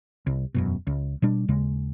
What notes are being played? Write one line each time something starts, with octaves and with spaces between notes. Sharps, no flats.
C2
E1 F#2 B2
C#2
B2 G3 D4
D#2 C#3 G#3